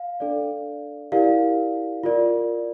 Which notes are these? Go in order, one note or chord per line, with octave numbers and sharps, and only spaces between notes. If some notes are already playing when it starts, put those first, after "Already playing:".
Already playing: F5
D4 A4 D5
E4 G4 A#4 D5 F5
F4 A#4 D5